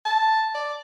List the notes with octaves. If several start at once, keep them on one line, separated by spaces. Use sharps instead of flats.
A5
D5